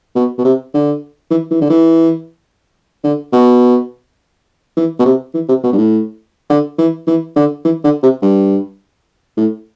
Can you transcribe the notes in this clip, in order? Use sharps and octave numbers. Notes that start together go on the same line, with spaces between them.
B2
B2
C3
D3
E3
E3
D3
E3
D3
B2
E3
B2
C3
E3
C3
B2
G2
A2
D3
E3
E3
D3
E3
D3
C3
G2
A2